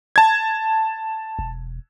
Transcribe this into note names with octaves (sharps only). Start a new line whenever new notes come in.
A5 G#6
E1